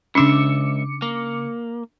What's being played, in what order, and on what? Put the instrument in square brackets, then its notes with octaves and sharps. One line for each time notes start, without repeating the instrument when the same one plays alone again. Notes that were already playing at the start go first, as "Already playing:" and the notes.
[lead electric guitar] C#2 E5 [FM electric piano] C#3 D6 C#7 [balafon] C#4 D4
[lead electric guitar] A#3